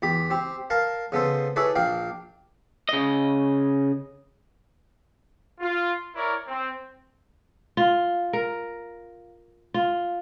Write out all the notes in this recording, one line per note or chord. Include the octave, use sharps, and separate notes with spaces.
E2 G4 B5
C4 G4
A#4 F5 A5 A#5
C#3 B3 A4 C5
E4 G#4 A4 B4 C#5 D5
A#1 D4 F5 G5
C#3 D#5
F4
E4 A#4 C#5 D5
C4
F4
A#4
F4